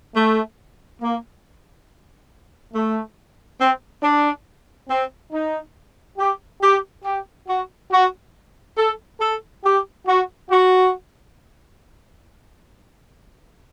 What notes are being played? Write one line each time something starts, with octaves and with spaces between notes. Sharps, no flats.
A3
A#3
A3
C4
D4
C4
D#4
G4
G4
G4
F#4
F#4
A4
A4
G4
F#4
F#4